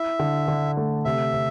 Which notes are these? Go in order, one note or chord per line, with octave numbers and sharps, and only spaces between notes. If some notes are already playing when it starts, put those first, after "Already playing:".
Already playing: E4 E5
D3
D3
A3
C3 E5
C3